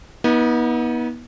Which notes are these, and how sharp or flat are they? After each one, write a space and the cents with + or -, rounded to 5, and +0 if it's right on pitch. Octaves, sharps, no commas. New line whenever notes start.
B3 -30 D#4 +35